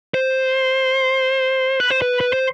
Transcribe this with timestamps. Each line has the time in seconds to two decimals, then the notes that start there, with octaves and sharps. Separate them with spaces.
0.14 C5
1.80 B4
1.90 C5
2.02 B4
2.21 B4
2.33 C5